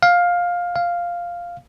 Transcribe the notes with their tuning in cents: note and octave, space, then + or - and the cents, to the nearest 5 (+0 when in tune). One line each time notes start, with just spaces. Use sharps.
F5 +15
F5 +0